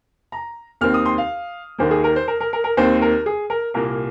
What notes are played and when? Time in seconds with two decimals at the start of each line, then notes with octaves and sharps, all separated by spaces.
0.32 A#5
0.81 D#2 D#3 C4 F6
0.94 D#6
1.06 C6
1.18 F5
1.78 D#2 D#3 A#3 C5
1.91 G#4
2.04 A#4
2.16 C5
2.28 A#4
2.40 A#4
2.53 A#4
2.64 A#4
2.77 D#2 D#3 C4 C5
3.02 A#4
3.26 G#4
3.50 A#4
3.74 C2 A#2 A#3 A#4